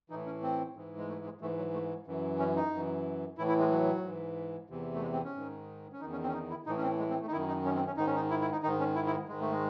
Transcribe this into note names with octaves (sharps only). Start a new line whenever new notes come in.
A2 E3 D#4
C#4
C4
G#2 E3
G#3
A3
G#3
G#2 E3 A3
F#3
A3
F#2 E3
C#4
D#4
F#2 E3
A2 E3 E4
E4
G#3
F#3
G#2 E3
E2 C3 E3
A3
G#3
C4
C#4
G#2 D#3
C#4
E2 D#3 D#4
C#4
C4
C#4
D#4
E4
A2 E3 D#4
C#4
C4
G#3
C4
A3
D#4
F#2 D#3 E4
D#4
C#4
C4
C#4
G#2 D#3 D#4
C#4
D#4
E4
E4
D#4
G#2 D#3 D#4
C#4
E4
E4
G#2 D#3 G#3
A3
G#3